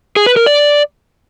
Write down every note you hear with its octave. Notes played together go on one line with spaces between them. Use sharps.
G#4
B4
A#4
D5